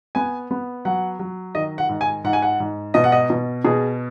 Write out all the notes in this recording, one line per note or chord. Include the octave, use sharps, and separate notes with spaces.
B3 G#5
B3
F#3 F#5
F#3
D#3 D#5
F#5
G#2
G#5
G#2 F#5
G#5
F#5
G#2
B2 D#5
F#5
D#5
B2
B2 G#4